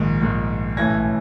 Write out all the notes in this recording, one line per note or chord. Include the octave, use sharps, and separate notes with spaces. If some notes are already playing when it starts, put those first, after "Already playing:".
Already playing: A#1 G#2 D#3
A#1 G#2 D#3
B1 A2 E3 A3 C#4 G#6 A#6